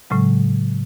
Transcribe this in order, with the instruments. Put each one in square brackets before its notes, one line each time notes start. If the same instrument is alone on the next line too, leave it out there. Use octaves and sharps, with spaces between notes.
[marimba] A2 C#3 F#3 G#3